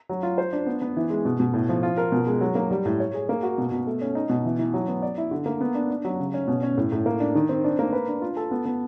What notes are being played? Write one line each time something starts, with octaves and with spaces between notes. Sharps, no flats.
F#3
F4
C5
D4
B3
B3
E3
G#3
B2
B2
A2
F3
F4
A#4
B2
G#3
F#3
A#3
G3
A2
C#5
G#4
A#3
F#4
B2
B2
A3
C#4
D#4
B2
E3
E3
F#3
B3
D5
E4
D3
A#3
B3
D4
D4
F#3
C#3
C#4
B2
C#4
A2
A2
A#3
D4
D#3
C4
D4
A#3
B4
D4
F4
A4
B3
B3